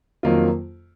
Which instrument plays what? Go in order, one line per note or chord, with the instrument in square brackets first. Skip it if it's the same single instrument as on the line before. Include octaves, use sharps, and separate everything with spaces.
[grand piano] F2 D#3 F#3 A#3 F4